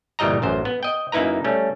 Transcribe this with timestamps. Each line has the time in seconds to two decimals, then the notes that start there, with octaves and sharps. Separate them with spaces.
0.19 G1 A#2 E3 G3 D#5 A#5
0.42 A1 F#2 C5
0.65 B3
0.83 D#5 G5
1.12 F#2 A#3 D#4 E4 B4 A#5
1.44 G3 A3 C#4